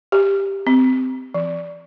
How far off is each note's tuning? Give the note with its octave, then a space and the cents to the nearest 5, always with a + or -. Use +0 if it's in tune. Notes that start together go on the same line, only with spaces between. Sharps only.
G4 +5
C4 -20
F3 -45